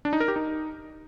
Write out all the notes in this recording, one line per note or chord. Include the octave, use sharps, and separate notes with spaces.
D4
D#4
A#4
G4
D#4